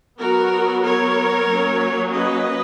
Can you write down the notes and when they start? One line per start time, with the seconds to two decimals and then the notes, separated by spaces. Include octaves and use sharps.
0.20 F#3 B3 F#4 A#4
0.84 A#4 C#5
1.49 F#3 A#3 C#4
2.13 B4 D#5